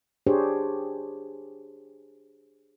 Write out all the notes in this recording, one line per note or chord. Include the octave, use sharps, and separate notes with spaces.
D4 G4 G#4 C5 C#5